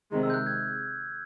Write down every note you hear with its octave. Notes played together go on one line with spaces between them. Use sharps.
C3 D#3 G#3
E6
G6
F#6
G#6